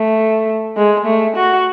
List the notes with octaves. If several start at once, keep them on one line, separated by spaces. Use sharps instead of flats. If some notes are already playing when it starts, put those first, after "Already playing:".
Already playing: A3
G#3
A3
F#4